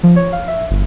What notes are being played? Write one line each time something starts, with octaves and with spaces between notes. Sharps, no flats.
F3
C#5
F5
E5
G1